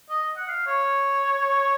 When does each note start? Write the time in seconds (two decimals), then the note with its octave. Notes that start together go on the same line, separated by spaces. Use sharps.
0.10 D#5
0.37 F#5
0.48 F5
0.67 C#5